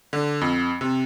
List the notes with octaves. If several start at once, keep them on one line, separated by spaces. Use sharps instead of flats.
D3
F2
C3